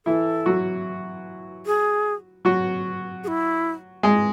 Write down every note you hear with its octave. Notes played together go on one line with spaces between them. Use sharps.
E3 E4 A4
F#3 F#4
G#4
F#3 F#4
G#4
E4
G#3 G#4